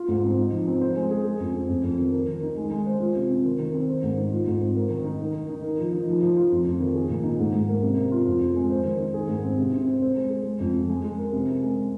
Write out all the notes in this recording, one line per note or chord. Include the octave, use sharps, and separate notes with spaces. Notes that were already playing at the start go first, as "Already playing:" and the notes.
Already playing: F4
G#2
C4
D#4
F3
C4
C5
G#3
G#4
G#4
F2
C4
F2
F2
D#3
A#4
D#3
D#4
G#3
G#3
C5
F4
C3
C4
D#3
D#3
C4
C5
G#2
D#4
F4
G#2
C4
A#4
D#3
D#4
A#4
D#3
D#4
A#4
F3
D#4
F3
F3
F4
F2
F2
D#3
G#4
A#2
D#4
G#2
G#2
A#3
C3
C3
F4
F2
F2
G#3
C5
D#3
D#4
G#4
G#2
C4
C3
C3
C4
C5
G#3
G#4
G#3
F2
F3
G#3
G#3
A#4
C3
C3
G#3